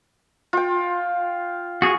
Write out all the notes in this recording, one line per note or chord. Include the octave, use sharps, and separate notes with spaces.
F4 G5
F#4 G#4